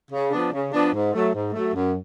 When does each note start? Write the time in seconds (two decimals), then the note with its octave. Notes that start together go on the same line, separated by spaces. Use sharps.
0.12 C#3
0.32 F3 B3 D4
0.52 C#3
0.73 F3 B3 D4
0.93 G#2
1.13 F#3 A3
1.33 G#2
1.54 F#3 A3
1.75 F#2